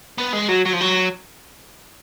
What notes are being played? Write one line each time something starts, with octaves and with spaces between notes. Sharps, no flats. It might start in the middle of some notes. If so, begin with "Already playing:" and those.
B3
G#3
F#3
F#3
F3
F#3